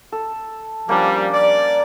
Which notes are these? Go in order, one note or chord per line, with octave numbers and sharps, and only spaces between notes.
A4
F3 G3 A#3 C#4 D4
D5